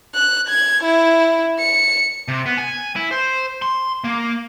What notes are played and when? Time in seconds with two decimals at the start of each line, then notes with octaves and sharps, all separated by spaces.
0.15 F#6
0.49 G#6
0.84 E4
1.59 C#7
2.28 C3
2.46 B3
2.58 G#5
2.96 E4
3.11 C5
3.62 C6
4.04 A#3